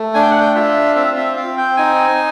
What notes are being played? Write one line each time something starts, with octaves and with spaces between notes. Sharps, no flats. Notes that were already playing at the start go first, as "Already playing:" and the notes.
Already playing: A3
D4 G#5
G5
F#5
G5
F4 E5
C4 E5
E5
C4 F5
G5
D#4 G#5